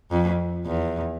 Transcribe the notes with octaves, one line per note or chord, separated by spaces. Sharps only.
F2
E2